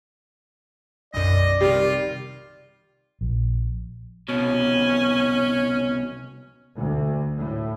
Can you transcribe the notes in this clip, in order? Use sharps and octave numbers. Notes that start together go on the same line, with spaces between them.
B1 F#2 D5 D#5
C3 D#3 G3 F4
A#1
C2 B2 C#4
D2
A2